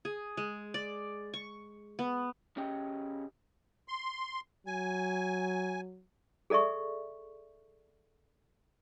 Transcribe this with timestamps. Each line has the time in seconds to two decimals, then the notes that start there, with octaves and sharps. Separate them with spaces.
0.05 G#4
0.37 G#3
0.74 D5
1.34 C#6
1.99 B3
2.57 C#3 C#4 G4 D#5 G5
3.88 C6
4.67 F#3 G#5
6.50 G#4 A4 D5 E5 C#6